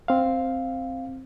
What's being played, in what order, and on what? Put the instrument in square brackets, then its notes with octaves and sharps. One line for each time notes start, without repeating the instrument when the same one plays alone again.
[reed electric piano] C4 F5